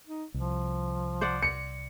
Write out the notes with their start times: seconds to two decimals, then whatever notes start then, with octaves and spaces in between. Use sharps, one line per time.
0.07 D#4
0.34 C2 F3
1.21 C5 D5 F#5
1.43 C#7